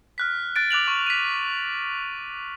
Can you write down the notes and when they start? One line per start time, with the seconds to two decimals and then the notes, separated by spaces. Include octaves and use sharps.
0.18 F6 F#6 B6
0.56 F#6 A6 D7
0.71 D6 F#6 F7 F#7
0.88 C#6
1.07 B6 D#7